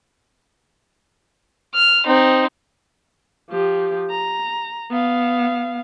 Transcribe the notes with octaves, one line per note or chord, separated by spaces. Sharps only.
F6
C4 D#4
F3 G4
A#5
B3 F5